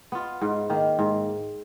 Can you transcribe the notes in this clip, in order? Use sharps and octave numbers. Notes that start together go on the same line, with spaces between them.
B3 F4
G#2
D#3 A#3
G#2